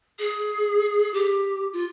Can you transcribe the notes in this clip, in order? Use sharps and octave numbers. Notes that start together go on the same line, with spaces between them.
G#4
G4
F4